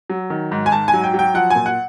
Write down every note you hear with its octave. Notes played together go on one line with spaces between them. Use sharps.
F#3
D#3
G#2
G#5
G#2 A5
G#5
F#3
G5
F#3
G5
F3 F#5
A#2 G#5
F#5